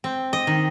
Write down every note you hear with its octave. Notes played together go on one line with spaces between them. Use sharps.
C4
D#5
D#3